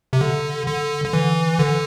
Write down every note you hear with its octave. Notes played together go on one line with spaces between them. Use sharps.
C3
D3
D3
D3
E3
D3